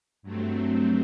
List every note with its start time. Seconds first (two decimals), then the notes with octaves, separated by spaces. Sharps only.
0.23 G2 F#3 A3 C4